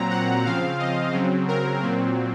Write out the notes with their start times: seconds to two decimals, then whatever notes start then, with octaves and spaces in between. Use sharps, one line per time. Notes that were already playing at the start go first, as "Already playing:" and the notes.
Already playing: A#2 F#3 C4 A#5
0.11 F#5
0.46 C#3 F3 C4 F5
0.79 D#5
1.14 C#3 F#3 C4
1.48 A#4
1.83 A#2 F#3 C4